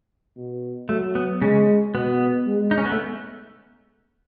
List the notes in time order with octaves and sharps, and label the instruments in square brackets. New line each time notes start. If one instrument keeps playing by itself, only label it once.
[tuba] B2
[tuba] F#3 [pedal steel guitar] A3
[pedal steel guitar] B3
[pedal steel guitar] C#3 C#4 [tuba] G#3
[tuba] B2 [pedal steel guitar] B3
[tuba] G#3
[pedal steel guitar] D#4
C#4
B3
A3